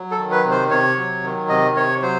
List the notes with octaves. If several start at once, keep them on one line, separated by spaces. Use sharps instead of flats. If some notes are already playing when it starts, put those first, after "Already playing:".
Already playing: F#3
A4
D#3
B4
C3
C5
C3 C#5
F#3
D#3
C3 D#5
C3 C#5
F#3 C5